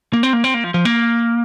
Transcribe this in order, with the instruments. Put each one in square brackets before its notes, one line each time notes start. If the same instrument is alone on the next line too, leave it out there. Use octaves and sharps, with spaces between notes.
[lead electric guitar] A#3
C4
A#3
C4
A#3
F3
F3
A#3